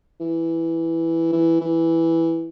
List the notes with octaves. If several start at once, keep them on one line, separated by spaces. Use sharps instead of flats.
E3
E3
E3